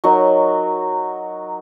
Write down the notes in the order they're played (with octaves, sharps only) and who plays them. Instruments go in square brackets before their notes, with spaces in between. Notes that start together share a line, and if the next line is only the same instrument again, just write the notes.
[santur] F#3 D#4 A#4